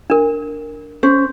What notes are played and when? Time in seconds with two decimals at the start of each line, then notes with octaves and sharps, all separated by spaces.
0.10 D4 A#4
1.03 C#4 C5